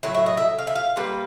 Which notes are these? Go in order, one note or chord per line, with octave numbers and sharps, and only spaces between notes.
A2 F#3 E5
E5
D#5
E5
F5
E5
F5
A#2 G3 A#3 B4